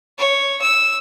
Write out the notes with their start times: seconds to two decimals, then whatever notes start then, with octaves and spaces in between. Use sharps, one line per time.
0.18 C#5
0.61 E6